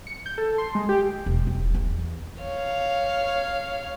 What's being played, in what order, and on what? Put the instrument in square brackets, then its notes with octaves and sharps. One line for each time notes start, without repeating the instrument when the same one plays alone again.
[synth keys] C#7
G6
A4
C6
G#3
G4
[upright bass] E1
E1
E2
[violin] C#5 F5